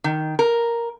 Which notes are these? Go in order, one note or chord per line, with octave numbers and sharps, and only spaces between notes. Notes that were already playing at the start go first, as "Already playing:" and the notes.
D#3
A#4